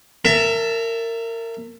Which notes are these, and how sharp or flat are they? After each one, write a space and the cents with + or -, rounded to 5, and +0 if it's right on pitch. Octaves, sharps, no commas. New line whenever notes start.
A#4 -25 E5 +20 A5 +0